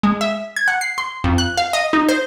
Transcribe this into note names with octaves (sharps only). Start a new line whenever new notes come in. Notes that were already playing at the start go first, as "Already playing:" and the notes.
G#3
E5
G#6
F#5
C7
C6
F2
F#6
F5
D#5
D#4
C5